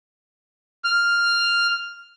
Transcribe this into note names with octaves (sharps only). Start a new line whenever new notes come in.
F6